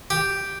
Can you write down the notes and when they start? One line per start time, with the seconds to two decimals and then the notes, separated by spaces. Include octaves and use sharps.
0.10 G4